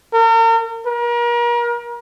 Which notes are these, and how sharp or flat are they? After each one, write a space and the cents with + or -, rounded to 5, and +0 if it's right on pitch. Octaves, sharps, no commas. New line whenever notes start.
A#4 -40
A#4 +35